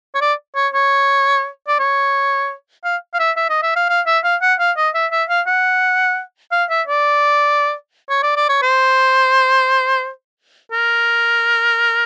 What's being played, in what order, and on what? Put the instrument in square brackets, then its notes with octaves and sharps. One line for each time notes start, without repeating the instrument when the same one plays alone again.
[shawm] C#5
D5
C#5
C#5
D5
C#5
F5
F5
E5
E5
D#5
E5
F5
F5
E5
F5
F#5
F5
D#5
E5
E5
F5
F#5
F5
E5
D5
C#5
D5
D5
C#5
C5
A#4